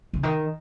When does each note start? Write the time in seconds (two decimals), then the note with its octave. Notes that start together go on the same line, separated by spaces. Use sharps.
0.13 C#3
0.23 D#3